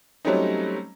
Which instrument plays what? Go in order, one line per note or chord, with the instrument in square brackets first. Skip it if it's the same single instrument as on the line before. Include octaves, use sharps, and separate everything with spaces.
[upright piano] F#3 G3 A3 C4 C#4 D#4